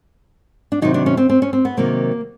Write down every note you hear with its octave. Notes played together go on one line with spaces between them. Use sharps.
D4
C3 D#3 F#3 D#4
D4
C#4
C4
C4
C#4
C4
B3
C3 D#3 F#3 A#3